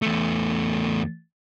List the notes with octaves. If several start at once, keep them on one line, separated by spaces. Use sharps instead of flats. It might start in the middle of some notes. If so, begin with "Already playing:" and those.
E2 A3